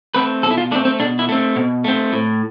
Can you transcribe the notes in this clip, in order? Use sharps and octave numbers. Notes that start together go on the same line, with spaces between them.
A3 C4 B4
B2 A4
E4
F4
A3 C4 D4
C4
B2 D4
E4
A3 C4
B2
A3 C4
A2